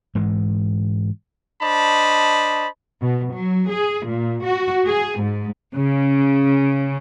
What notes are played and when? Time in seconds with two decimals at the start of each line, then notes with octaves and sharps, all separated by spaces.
0.15 G#2 E3 G#3
1.62 D4 C5 D#5 A5 B5
3.02 B2
3.34 F#3
3.70 G#4
4.08 A#2
4.46 F#4
4.87 G#4
5.21 G#2
5.74 C#3